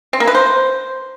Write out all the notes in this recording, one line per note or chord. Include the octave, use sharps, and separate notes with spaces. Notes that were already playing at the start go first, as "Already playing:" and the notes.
C4
A#3
B4
C5